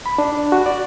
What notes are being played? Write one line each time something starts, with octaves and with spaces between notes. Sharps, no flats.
B5
D4
F#4
D5